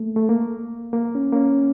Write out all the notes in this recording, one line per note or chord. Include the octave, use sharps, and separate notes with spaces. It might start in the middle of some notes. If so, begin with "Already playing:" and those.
Already playing: A3 A#3
A3
A#3
A#3
C#4
A#3
C#4